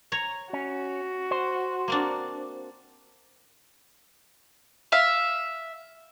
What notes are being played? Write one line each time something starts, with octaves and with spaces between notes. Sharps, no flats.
C#5 A#5
C#4 F#4
C5
A#3 C4 D4
E5 F5